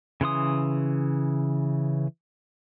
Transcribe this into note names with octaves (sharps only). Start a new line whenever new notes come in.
C#3 E3 C6 D#6